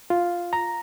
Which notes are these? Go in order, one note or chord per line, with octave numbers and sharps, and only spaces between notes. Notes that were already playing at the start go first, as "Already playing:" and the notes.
F4
A#5